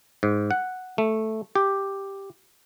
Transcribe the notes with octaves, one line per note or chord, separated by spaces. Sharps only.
G#2
F#5
A3
G4